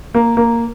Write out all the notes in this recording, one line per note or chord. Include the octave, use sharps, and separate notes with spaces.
A#3
A#3